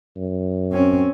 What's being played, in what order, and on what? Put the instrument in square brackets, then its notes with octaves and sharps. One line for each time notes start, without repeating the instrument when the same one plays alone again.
[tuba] F#2
[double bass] C4 C#4